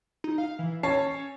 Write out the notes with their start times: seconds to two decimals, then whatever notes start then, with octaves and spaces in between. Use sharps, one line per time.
0.24 D#4
0.38 F5
0.59 E3
0.83 C#4 C#5 A5 C7